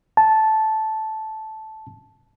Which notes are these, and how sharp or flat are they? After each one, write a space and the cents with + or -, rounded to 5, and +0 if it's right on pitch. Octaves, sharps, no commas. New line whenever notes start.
A5 -10